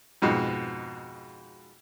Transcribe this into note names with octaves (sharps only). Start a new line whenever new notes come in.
F2 G#2 B2